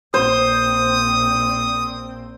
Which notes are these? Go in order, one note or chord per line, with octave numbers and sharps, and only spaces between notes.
A#1 C4 C5 D#6